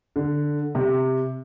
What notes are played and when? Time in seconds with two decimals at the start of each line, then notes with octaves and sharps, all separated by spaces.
0.16 D3
0.75 C3